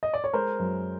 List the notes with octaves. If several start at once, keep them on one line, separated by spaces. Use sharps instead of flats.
D#5
D5
C#5
G#3 A#4 C5
F#2